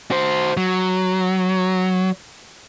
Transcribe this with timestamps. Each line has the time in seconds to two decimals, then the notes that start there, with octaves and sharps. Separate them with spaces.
0.11 F#4 C5
0.57 F#3